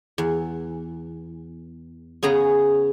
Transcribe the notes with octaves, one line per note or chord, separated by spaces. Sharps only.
E2
C#3 B3 G#4 A#5